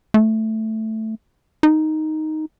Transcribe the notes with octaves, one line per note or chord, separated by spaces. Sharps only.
A3
D#4